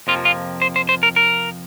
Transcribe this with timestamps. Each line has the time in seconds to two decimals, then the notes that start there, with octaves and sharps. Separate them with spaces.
0.07 F2 C3 F3 A#3 F4
0.25 F4
0.62 C5
0.76 C5
0.89 C5
1.03 A#4
1.16 A#4